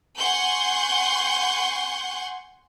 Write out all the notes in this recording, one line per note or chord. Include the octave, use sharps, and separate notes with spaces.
F#5 G#5 C6 C#6 G6